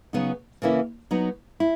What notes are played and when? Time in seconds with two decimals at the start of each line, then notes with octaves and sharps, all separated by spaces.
0.13 C#3 F#3 B3 D#4
0.62 C#3 E3 A#3 C#4 E4
1.11 F#3 B3 D#4
1.60 E4